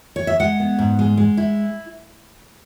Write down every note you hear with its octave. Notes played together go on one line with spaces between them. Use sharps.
C#5
E5
G#3 F#5
B3
G#2
G#3
G#3
E4